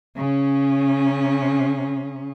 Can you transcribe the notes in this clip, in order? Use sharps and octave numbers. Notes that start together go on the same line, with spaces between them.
C#3 C#4